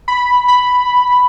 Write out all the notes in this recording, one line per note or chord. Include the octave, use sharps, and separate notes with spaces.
B5
B5